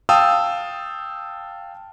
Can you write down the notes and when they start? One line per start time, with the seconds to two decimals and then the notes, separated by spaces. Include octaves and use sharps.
0.09 F5 G5 A5 D#6 E6